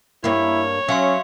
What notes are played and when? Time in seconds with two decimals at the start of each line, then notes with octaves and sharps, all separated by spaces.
0.24 G2 A#3 E4 C#5
0.88 F#3 C#4 E5 F5 C6